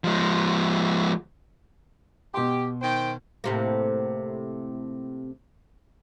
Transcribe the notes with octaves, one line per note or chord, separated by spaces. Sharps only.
F3 G#3
B2 G4 C6
D#3 C5 G5
A2 C3 A#3